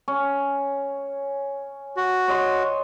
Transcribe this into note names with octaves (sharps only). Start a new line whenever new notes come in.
C#4
F#4
C#5 D#5 C6